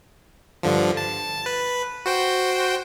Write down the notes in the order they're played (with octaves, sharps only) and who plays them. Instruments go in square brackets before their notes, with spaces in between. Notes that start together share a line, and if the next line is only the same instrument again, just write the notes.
[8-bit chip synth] G2 D3 F3
A5
B4
F#4 C5 G5